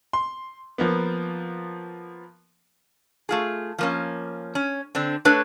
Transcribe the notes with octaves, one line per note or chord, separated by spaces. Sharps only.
C6
F3 A#3 B3
A3 F4 G#4
F3 A#3 C#4
C#4
D3 C4 D4
A3 D4 A4 B4 C#5